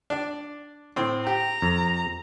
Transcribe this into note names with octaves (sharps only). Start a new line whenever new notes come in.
D4 D5
A2 C4
G4 A#5
F2